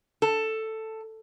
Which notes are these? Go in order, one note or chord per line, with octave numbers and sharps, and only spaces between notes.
A4